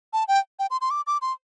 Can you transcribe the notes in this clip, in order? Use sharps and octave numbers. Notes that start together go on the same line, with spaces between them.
A5
G5
G5
C6
C6
D6
D6
C6